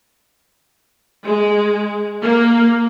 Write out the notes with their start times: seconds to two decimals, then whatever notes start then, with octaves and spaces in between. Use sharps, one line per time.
1.25 G#3
2.23 A#3